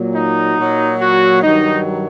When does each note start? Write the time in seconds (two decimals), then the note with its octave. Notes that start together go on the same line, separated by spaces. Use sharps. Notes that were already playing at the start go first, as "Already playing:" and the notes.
Already playing: A#2 F#3
0.16 D#4
0.58 A#2 F#3
1.00 F#4
1.43 G2 D#3 F#3 D#4